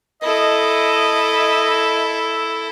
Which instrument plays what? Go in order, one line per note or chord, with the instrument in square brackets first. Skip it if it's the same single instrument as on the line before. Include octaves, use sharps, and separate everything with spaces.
[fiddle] E4 A4 [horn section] D#5